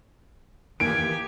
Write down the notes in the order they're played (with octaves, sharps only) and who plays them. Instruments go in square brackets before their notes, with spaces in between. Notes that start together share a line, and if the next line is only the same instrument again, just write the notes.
[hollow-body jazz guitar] D#3 E3 A#3 [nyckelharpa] G4 G#5 [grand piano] D7